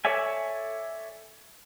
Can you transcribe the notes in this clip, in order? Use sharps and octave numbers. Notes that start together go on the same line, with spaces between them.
A4 C#5 D5 E5 G#5